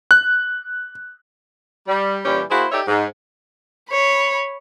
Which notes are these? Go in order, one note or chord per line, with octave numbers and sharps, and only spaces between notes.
F#6
G3
A#2 E3 G3 C#4 E4 G4
A#3 E4 F#4 G#4 C5
D#4 G4 A4 C#5 D5 E5
G#2
C#5 B5